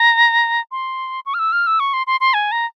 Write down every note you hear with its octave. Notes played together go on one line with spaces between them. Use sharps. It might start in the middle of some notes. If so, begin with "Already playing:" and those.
Already playing: A#5
C6
C#6
F6
E6
F6
E6
C#6
C6
C6
C6
G#5
A#5